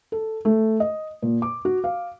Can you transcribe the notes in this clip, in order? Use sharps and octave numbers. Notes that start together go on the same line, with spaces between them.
A4
A3
D#5
A#2
D6
F#4
F5